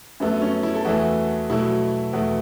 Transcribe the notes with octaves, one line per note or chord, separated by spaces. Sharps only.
F#2 F#3 A3 B3
C#4
E4
A4
E2 E3 A3 F#4
B2 F#3 A3 E4
E2 B2 A3